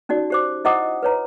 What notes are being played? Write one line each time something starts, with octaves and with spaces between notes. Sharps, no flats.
C#4 D#4 F#4 D5
G4 C5 D6
E4 C5 D#5 F#5 D6 D#6
B4 C#5 A#5